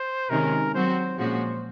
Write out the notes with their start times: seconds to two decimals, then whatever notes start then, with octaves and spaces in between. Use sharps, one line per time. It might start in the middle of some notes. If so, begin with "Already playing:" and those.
Already playing: C5
0.30 C3 D#3 G#3 C#4 A#4
0.75 F#3 C4 F#4 C5
1.18 A#2 F3 G#3 C#4 F#4 C5